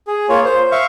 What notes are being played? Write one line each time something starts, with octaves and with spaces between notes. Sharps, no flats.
G#4
A#3 F4 C#5
C5
E5 F5 C#6